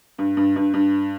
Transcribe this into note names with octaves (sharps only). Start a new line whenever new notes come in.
G2
G2
G2
G2